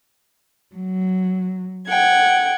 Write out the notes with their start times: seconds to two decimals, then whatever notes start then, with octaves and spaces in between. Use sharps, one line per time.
0.76 F#3
1.88 F#5 G5 G#6